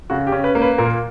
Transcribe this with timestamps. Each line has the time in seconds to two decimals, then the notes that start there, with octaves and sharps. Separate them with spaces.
0.10 C#3 F#4
0.27 G4
0.32 C#4
0.44 B4
0.55 A#3
0.62 B4
0.78 A#2 A#4